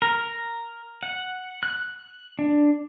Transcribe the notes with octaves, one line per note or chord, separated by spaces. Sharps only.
A#4
F#5
F#6
D4